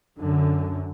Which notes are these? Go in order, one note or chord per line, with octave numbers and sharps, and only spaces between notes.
F#2 D3